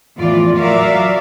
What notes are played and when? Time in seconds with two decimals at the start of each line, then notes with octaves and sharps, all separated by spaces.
0.17 E2 A2 E3 F3 F4 D5
0.58 F#3 F#4 A#4 D5 E5 F5